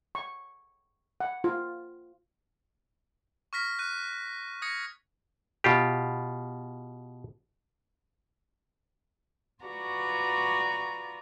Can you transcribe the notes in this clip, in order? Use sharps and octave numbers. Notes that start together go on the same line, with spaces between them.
C#6
F#5
F4
C#6 F6 A#6 B6
F#6 D#7
D#6 G#6 A#6 C#7
B2 F4 G4
F4 F#4 B4 D5 A#5 C#6